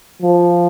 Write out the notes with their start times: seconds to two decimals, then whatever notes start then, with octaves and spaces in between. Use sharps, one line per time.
0.22 F3